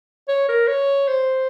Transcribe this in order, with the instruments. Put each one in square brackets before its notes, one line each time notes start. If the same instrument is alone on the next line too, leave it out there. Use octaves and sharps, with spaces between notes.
[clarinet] C#5
A#4
C#5
C5